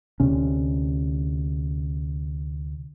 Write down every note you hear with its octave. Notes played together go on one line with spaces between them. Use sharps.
D2 C3 C#4